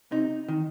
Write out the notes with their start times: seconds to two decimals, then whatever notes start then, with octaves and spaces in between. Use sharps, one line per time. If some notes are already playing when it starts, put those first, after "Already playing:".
0.11 C3 D#4
0.49 D#3